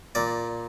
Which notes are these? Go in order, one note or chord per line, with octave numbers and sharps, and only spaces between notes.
A#2 D5